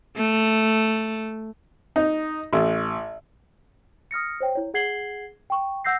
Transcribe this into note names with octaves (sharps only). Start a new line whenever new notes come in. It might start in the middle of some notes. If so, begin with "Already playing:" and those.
A3
D#4
A1
D#6 F6 A#6 C#7
C5 C#5 G5
E4 C#5
G#4 F#5 G#6 C7 F#7 G7
G5 C#6
F#5 E6 G6 A#6 C7